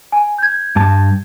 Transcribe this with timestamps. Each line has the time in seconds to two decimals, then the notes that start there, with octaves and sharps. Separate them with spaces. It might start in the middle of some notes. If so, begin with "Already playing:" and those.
0.12 G#5
0.38 G6 G#6
0.76 G2 A5